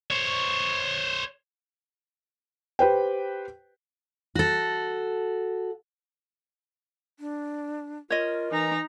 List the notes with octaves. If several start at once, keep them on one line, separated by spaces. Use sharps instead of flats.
C5 C#5
G4 B4 C5 G5
F#4 A4
D4
F4 A#4 C#5 D#5
E3 D#4 A#5